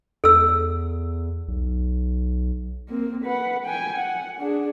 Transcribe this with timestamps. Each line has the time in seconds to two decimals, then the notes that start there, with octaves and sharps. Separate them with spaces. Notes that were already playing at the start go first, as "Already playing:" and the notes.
0.24 E2 A4 E6
1.48 B1
2.89 A#3 C4
3.24 B4 F#5
3.65 G5 G#5
3.97 F#5
4.39 D4 G#4